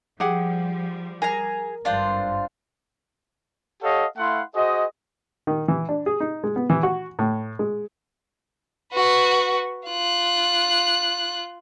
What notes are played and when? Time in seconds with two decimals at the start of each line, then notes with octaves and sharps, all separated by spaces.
0.20 F3 G3 G4 G#4 F#5
1.22 G#4 A#4 A#5
1.85 G#1 G2 D4 F4 C5
3.83 G4 A4 C#5 D#5 F5 F#5
4.18 A3 E4 F5 F#5 C6
4.55 F#4 G#4 C5 D#5
5.47 D#3
5.68 E3
5.89 D4
6.06 G#4
6.20 D#4
6.44 G#3
6.56 B3
6.70 E3
6.83 F#4
7.19 A2
7.59 G#3
8.93 F#4 B4
9.88 F4 F#6